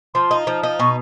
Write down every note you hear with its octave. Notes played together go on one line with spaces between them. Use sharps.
F3 C6
D#4
F3
D#4
B2 C#6